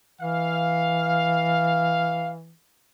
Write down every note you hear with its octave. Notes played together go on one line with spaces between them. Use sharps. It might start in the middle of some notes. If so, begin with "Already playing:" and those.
E3 F5